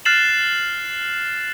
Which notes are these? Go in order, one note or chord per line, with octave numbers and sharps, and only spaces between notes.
F6 F#6 A6 C7 E7 F#7